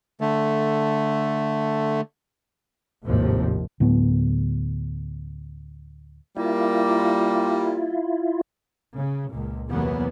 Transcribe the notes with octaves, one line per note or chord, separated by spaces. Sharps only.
D3 A3
G#1 D#2 A2 C3 F3
D2 A2 F#3 B3
G3 A#3 E4 F4
C#3
C#2 A#2
E2 C3 E3 F#3 A#3 B3